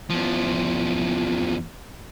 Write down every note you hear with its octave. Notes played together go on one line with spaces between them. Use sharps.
E2 F3